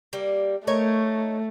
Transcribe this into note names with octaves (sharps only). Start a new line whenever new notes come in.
G3 A#3
A3 D#4 A#4 C#5